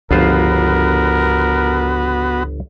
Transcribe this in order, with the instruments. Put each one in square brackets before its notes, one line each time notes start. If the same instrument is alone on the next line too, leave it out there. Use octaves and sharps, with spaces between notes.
[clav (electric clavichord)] G1 F4 C5 [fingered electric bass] C#2 F3 [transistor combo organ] B3 F#4 [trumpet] A#4